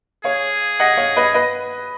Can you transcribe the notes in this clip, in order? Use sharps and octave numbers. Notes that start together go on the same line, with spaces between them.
G#4 C#5 F5
D#5 F#5
C#5 F5
B4 D#5
B4 D#5